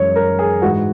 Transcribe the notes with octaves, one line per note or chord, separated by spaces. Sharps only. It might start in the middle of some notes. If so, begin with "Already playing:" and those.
Already playing: F#2 E3 G#3 C#5
A#4
G#4
G#2 E3 G#3 F#4